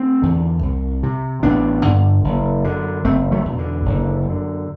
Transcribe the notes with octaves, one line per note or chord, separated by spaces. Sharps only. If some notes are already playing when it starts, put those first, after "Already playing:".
Already playing: A3 C4
E2 D3
C2
C3
A1 B3 D4
G2 D3
F#1
F#2 D3
F#1 A3 C4
F#3 A3
E2 B2
D3
F#1
F#2 D3